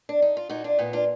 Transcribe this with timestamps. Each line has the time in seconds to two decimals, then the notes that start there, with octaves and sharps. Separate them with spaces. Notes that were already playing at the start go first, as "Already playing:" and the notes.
0.09 D4
0.22 D#4
0.37 F4
0.49 A#2 D#4 F#4
0.64 D4 F4
0.79 A#2 B3 D#4
0.93 D4 F4